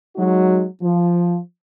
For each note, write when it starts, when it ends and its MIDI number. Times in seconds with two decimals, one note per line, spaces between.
0.16 0.65 54
0.16 0.65 56
0.16 0.65 63
0.16 0.65 66
0.82 1.38 53